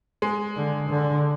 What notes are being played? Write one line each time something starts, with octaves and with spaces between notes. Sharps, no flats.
G#3
D3
D3